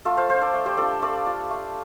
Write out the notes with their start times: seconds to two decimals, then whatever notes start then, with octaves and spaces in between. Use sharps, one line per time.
0.05 A3 F4 A4
0.17 C5 F5
0.29 D4 F4 C5 F5
0.41 A4 D5
0.54 A3
0.66 G4 C5
0.77 D4 F4 A4 D5
1.02 A3 A4 D5
1.26 D4 F4
1.50 A3